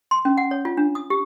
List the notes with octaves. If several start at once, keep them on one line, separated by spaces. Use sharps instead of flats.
C6
C#4
F#5
C#5
F4
D4
D#6
G4